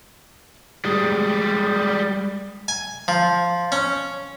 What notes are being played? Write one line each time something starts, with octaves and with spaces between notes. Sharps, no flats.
G3 G#3
G#5
F3
C#4